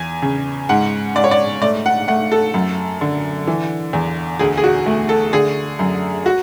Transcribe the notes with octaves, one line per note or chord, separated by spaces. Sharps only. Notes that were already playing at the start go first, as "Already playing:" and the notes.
Already playing: E2 G#5
C#3
G#2 F#5
G#2 D5
C#5
D5
A3 D5
F#5
A3 F#5
A4
F#2
D3
E3
E2
D2 G#4
G#4
F#4
A3
A4
D3 G#4
F#2
F#4